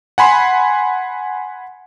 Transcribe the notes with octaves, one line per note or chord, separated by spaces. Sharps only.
F#5 G#5 B5 C6